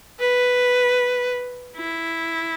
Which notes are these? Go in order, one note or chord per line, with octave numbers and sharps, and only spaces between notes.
B4
E4